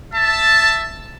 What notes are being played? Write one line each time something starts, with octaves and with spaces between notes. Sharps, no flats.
E5 A5